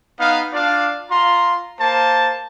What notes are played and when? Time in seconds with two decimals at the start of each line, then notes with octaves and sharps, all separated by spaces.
0.19 B3 D#4 F5
0.53 D4 F4 D5 F5
1.10 F4 A#5 C6
1.80 A#3 C5 A5